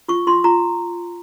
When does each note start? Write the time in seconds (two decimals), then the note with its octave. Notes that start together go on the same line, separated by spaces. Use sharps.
0.08 F4 C#6
0.27 F4 C6
0.44 F4 A#5